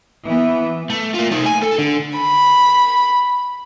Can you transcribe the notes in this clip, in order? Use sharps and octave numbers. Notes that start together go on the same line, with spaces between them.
E3 B3
A3
A#3 F4
A3 D#4
G#5
A4
D3
B5